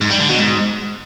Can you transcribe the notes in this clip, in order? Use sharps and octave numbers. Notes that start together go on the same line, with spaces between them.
G#2
G3
D3
B2
G#2